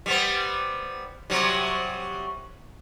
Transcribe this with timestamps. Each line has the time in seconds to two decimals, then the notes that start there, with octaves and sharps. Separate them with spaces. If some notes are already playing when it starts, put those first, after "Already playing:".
0.06 G3 B3 C4
1.30 C3 F#3 G3